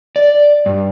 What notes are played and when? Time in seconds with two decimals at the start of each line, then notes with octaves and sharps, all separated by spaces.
0.16 D5
0.66 G2